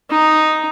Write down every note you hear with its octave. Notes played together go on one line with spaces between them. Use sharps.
D#4